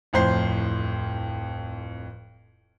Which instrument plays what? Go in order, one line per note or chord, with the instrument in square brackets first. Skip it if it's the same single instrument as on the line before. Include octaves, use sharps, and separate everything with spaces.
[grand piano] D1 F2 A2 C5 C7